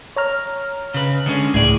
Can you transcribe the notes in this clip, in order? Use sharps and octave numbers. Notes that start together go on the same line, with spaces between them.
C#5 A#5 F6
C#3 B4
D3 G#3 C#4
C#2 A2 G#4 D5